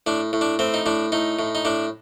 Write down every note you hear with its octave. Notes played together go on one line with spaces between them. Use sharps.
A2 D4
A2
D4
A2 C4
D#4
A2 D4
A2 D#4
A2
D#4
A2 D4